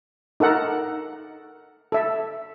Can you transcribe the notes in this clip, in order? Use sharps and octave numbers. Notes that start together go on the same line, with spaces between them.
D#4 A4 A#4 F#5
A4 E5